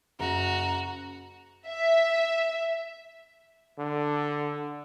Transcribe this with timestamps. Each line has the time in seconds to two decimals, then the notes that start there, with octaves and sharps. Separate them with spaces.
0.20 F#1 F#4 A#5
1.67 E5
3.79 D3